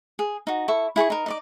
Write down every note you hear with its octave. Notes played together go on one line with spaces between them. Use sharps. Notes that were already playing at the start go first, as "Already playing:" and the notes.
G#4
D#4 F#4
E4 A4 C#6
E4 G#4 A5 C#6
D#4 A#4
D#4 D5 D6